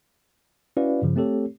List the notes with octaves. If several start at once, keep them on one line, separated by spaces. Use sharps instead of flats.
C#4 E4 F#4 B4 D5 F5
G2 C#3 F3
A3 C4 G4 A4 C#5